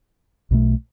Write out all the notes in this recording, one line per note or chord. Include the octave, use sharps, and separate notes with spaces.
B1 B2 A3